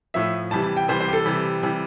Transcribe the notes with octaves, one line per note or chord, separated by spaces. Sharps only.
A2 F3 E5
C3 E3 G3 A5
A5
G5
C3 E3 G3 C5
C5
G4
A4
C3 E3 G3
C3 E3 G3